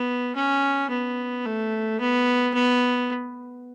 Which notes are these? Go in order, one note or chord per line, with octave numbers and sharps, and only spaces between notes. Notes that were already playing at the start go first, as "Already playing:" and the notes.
Already playing: B3
C#4
B3
A3
B3
B3